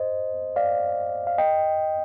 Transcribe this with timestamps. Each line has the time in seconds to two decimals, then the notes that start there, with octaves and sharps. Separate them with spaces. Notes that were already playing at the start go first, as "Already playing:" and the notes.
Already playing: C5 D#5
0.56 D5 F5
1.27 F5
1.38 D#5 G5